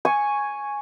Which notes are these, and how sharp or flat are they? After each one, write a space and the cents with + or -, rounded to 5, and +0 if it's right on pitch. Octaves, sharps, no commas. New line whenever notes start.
G#5 +0 C#6 +0